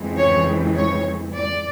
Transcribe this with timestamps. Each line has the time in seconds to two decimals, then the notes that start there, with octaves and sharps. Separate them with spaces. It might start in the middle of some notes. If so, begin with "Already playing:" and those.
Already playing: F2 C#3 E3 G#3
0.18 C#5
0.77 C#5
1.35 D5